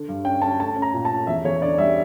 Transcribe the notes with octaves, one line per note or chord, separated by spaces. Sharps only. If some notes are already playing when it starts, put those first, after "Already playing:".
Already playing: D3
G2
C#4 G5
C#4 A5
A3 A5
C#4
A#5
A#2
A5
C#4
E2 E5
E2 C#5
D3 D5
G3 E5